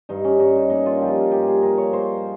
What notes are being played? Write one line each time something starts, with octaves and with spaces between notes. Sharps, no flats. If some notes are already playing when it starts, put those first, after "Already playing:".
G2 D#4
C#4
G2 D#4
D#4
A#3 D#4
F4
F3 G4
G2 G4
G#4
F3 A#4
C#5
A#3 C5